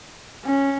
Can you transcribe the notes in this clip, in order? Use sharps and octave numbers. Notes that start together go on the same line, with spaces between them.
C#4